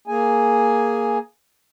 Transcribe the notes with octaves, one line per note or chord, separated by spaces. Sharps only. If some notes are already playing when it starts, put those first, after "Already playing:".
A#3 G#4 G#5